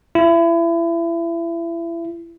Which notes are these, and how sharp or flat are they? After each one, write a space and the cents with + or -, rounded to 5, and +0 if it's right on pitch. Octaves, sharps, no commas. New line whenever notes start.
E4 +30